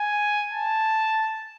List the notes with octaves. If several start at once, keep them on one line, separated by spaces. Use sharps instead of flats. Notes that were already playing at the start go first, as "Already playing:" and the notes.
Already playing: G#5
A5